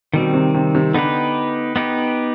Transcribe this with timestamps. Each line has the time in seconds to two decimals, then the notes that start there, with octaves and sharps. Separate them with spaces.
0.14 B2 D#3 G3 C4
0.34 C3
0.54 C3
0.75 C3
0.94 D3 B3 D#4 G4 B4
1.76 B3 D#4 G4 B4